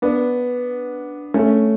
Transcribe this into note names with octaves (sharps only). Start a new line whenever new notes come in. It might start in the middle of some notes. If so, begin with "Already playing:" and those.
B3 D4
A3 C#4